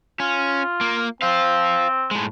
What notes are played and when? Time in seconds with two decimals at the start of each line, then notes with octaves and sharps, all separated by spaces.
0.20 C#4 F4
0.81 A#3
1.22 C4 C5 F5
2.11 A2 G#3